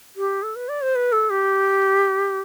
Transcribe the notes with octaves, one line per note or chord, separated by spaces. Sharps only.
G4
A4
B4
D5
C5
B4
A4
G4